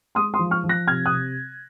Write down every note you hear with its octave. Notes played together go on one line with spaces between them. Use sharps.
G#3 C6 D#6
C6 D#6
F3
C#6 F6
F3
F#6 A#6
C3 F6 G#6
D#6 F#6
C3